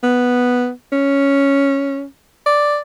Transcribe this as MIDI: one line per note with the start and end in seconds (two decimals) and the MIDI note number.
0.03 0.70 59
0.92 2.03 61
2.46 2.78 74